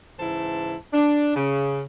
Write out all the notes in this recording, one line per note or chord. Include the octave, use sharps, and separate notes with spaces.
G#2 C#3 E3 E4 C5 A5
D4
C#3